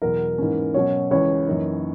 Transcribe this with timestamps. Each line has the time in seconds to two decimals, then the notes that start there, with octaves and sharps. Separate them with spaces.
0.02 E2 B2 F#3 A#4
0.38 G#2 E3 A#3 C#4
0.74 B2 F#3 C#4 C#5
1.11 C#2 C#3 E3 C#5
1.46 F#2 E3 A#3 D#4